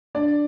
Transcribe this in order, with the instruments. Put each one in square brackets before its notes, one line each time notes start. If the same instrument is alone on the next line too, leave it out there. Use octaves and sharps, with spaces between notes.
[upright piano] D4 D5